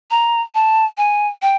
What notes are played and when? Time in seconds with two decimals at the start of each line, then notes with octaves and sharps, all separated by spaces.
0.11 A#5
0.55 A5
0.97 G#5
1.42 G5